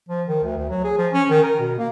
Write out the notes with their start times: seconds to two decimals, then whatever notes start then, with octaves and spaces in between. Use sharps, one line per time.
0.09 F3
0.27 D#3
0.43 D2
0.57 D2
0.70 F#3
0.84 G#4
0.98 F3
1.13 C#4
1.30 D#3
1.43 A#4
1.59 B2
1.79 A#3